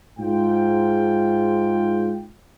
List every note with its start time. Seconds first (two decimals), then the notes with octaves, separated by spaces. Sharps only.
0.19 G#2 F4 G5